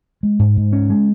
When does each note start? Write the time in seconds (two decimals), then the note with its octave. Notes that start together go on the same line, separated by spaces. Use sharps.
0.23 G#3
0.39 G#2
0.57 G#2
0.73 C#4
0.90 G#3